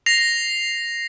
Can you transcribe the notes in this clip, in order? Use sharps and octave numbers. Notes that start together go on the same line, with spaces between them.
A#6 C7 F7